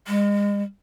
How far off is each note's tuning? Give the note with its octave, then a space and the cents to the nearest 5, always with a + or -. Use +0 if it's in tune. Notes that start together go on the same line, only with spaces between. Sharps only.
G#3 -35